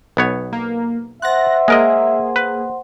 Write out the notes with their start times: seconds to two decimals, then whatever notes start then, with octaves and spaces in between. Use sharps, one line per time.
0.17 B1 B3 C#5
0.53 A#3
1.22 C5 E5 F#5 C6 F#6 A6 A#6
1.68 G#3 A#3 G#4 A#4 D#5
2.36 B4